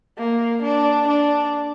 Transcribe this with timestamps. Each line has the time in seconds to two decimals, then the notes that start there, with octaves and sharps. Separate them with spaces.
0.18 A#3
0.63 D4
1.08 D4